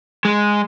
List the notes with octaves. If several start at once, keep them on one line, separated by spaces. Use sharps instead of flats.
G#3